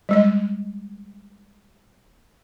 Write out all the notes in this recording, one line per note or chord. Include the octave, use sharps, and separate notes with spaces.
G3 G#3 D#5